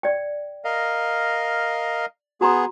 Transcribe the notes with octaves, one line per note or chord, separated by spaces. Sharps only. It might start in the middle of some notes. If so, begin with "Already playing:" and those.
D5 G5
A#4 D#5 F5
B3 F#4 G#4 A#5 C6